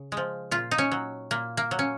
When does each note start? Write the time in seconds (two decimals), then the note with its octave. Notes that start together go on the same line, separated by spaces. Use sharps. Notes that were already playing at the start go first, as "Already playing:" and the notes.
Already playing: C#3
0.12 G#3
0.17 F3
0.51 A#2 F4
0.71 D#4
0.78 C#4
0.92 F#3
1.31 A#2 A#3
1.57 A#3
1.71 F#3
1.79 C#4